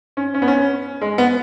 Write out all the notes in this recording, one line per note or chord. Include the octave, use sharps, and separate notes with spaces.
C#4
C#4
B3
C#4
G#3
B3